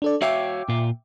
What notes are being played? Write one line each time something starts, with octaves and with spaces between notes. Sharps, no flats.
D4 A4 D5
F#4 C#5 E5 F5 G5 D6
A#2 F4